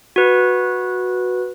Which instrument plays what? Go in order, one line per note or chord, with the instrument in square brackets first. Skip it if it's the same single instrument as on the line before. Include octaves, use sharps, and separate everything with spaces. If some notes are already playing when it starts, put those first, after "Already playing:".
[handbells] F#4 B4